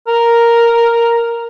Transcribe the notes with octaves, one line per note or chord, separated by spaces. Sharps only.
A#4